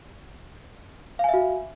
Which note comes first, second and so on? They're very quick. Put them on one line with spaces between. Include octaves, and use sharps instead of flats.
F5 G#5 E5 F#4